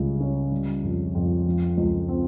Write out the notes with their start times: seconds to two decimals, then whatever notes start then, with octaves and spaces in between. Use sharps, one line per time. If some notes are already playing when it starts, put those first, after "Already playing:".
Already playing: C#2 C#3 G3
0.20 C#4
0.52 G3
0.83 F2
1.15 F2
1.46 F3
1.78 C#2
2.08 C4